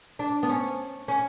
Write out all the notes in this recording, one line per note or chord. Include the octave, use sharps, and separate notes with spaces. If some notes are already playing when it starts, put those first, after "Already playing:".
D4
B3
C#4
C#4